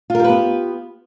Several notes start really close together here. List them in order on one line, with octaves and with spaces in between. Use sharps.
F4 A#4 G4 B4 B3